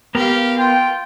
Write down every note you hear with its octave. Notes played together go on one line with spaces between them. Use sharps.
B3 G4 A#4 F5
F4 G5